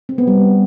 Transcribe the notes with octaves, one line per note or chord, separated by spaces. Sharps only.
C4
B3
G3